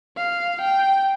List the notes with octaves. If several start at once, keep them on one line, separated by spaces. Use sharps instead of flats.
F5
G5